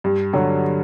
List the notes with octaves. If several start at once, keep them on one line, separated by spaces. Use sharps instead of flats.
G2
D3 F#3